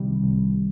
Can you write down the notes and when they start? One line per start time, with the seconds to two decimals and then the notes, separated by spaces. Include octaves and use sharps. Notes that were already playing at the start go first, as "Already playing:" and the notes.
Already playing: C2 C3 D#3 G3
0.24 C2